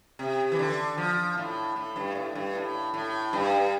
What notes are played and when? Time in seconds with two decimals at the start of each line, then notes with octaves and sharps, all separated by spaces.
0.19 C3
0.52 E3
0.59 D3
0.98 F3
1.37 A2
1.76 A2
1.96 G2
2.15 A2
2.35 G2
2.55 A2
2.94 A2
3.33 G2